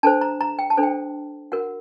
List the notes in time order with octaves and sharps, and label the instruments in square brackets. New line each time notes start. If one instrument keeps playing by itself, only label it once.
[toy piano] D4 A4 C5 A5
A#5
A#5
G5
A5
D4 A4 C5
G5
F#4 A#4 F#5